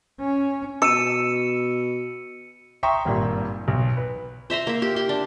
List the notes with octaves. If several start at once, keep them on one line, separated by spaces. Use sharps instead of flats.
C#4
B2 E6 C#7 D#7
E5 G5 A#5 C6 C#6 D#6
G#1 G2 A#2
B1
B4
C5 E5 A#5 C6
A#3 E5
G4
G4 C6
D4